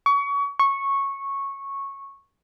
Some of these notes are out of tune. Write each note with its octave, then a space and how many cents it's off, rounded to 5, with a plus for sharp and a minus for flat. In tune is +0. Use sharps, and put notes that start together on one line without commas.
C#6 +30
C#6 -10